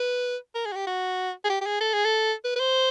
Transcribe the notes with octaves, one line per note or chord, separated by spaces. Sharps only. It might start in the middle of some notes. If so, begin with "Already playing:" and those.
Already playing: B4
A#4
G#4
F#4
G4
F#4
G#4
G4
G4
G#4
A4
G#4
A4
B4
B4
C5